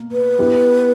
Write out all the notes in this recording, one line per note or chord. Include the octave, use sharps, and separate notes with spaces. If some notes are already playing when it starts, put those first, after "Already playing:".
Already playing: B2 A#3
B4
B3 E4 G4